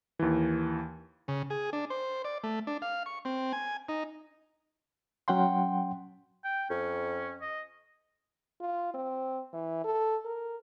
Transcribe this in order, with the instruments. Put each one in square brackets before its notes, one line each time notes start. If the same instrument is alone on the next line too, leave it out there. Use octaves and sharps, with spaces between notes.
[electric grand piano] D#2 E3
[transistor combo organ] C#3
G#4
D4
C5
D5
A3
D4
F5
C#6
C4
G#5
D#4
[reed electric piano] F#3 C#4 F#5 G5 C6
[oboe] G5
[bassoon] F2 [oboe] C#4
[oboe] D#5
[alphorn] F4
C4
E3
A4
A#4